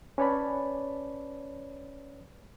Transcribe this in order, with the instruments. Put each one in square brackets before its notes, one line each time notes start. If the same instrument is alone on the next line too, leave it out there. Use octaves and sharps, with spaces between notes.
[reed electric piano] C#4 B4 C#5 D5 A5 B5